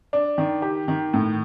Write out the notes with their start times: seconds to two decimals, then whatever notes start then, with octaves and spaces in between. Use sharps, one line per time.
0.13 D4
0.38 D#3
0.62 G4
0.88 D#3
1.14 A2